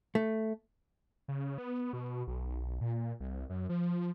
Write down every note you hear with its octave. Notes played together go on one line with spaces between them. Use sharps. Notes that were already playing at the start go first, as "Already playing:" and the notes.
A3
C#3
B3
B2
B1
A#2
C2
F#2
F3